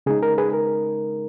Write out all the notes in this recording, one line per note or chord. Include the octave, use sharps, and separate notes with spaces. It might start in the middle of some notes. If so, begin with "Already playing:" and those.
C#3 G#3 D#4 G#4
A#4
G#4 B4
A#4